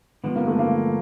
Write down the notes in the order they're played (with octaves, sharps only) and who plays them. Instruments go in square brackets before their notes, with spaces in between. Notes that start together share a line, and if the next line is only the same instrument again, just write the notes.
[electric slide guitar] G2 D3 F3 G#3 [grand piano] B3
[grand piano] A#3
A3
A#3